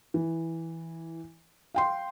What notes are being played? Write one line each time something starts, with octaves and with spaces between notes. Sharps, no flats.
E3
F5 G5 C6